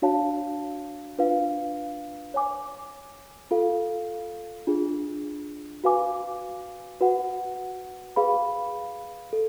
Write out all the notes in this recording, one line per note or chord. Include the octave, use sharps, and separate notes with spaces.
D4 F#4 C#5 F5 A5
D4 F4 B4 F5
C#5 G#5 D6
F4 A4 F5
D4 F4 G#4
F#4 B4 F5 G#5 D6
F#4 B4 F#5
G#4 B4 F5 B5
A4